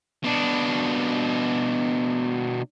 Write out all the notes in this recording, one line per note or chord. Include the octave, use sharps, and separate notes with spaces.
B2 D4